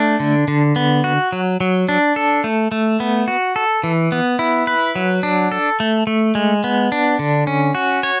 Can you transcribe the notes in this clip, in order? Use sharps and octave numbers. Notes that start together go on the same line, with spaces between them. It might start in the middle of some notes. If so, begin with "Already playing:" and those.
Already playing: A3 D4
D3
D3
B3
F#4
F#3
F#3
D4
A4
A3
A3
B3
F#4
A4
E3
B3
E4
B4
F#3
D4
A4
A3
A3
G#3
B3
D4
D3
C#4
F#4
C#5